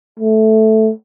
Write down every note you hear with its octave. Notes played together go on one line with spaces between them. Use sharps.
A3